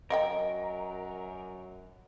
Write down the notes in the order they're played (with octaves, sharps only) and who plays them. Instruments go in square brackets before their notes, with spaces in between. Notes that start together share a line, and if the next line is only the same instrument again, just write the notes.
[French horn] F#2 [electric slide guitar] A#4 [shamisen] D5 F#5 G5 [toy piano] D#5